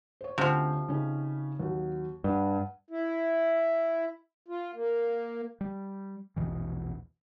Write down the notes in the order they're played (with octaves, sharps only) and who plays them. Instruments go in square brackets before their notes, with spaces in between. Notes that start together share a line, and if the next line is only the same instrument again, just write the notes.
[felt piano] C5 C#5
[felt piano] D2 C#4 G5 [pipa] C3 F3
[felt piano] C#3 C#4 D#4
D#2 F#3
[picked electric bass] G2 [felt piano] F#5
[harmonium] E4
F4
A#3
[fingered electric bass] G3
A#1 E2 B2 E3